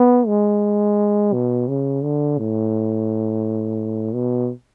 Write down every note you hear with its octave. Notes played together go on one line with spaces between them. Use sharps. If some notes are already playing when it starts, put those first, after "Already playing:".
Already playing: B3
G#3
B2
C#3
D3
A2
B2